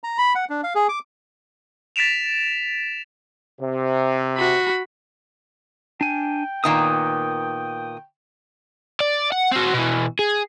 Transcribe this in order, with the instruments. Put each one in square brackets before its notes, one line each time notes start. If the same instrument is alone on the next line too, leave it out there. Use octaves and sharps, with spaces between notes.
[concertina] A#5
B5
F#5
D4
F5
G#4
D6
[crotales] A6 B6 D7 E7 F7
[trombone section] C3
[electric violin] F#4 B5
[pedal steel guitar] D4 G#5 [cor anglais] G5
[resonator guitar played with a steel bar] A#2 D#3 B3 [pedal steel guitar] D#6
[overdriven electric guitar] D5
F#5
C4 F#4
B2 E3
G#4